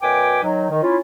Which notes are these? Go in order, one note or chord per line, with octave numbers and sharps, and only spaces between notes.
F#2 B2 B4 G5 G#5 D6
D#3 F#3 D#4
D#3
C#4 E4 F4